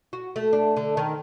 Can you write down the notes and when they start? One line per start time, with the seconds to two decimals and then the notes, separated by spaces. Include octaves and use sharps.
0.13 F#4
0.36 A3
0.53 D4
0.77 D3
0.97 D#3